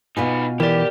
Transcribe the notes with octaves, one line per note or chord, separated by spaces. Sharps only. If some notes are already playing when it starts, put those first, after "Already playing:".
B2 D#4 F4 B4 G#5
E3 G4 A#4 D5